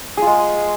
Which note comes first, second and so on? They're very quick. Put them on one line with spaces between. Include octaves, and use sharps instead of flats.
G#4 F4 G#3